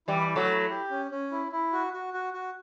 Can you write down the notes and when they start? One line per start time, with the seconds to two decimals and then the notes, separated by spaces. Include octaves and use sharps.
0.08 E3 G3 E4
0.29 E4
0.36 F#3 A3
0.50 E4
0.70 G4
0.91 C#4
1.11 C#4
1.32 E4
1.52 E4
1.73 F#4
1.94 F#4
2.14 F#4
2.33 F#4